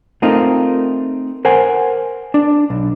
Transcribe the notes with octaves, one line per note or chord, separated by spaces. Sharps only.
A3 C4 D#4 F4 A#4
A#4 C5 F#5 G#5
D4
B1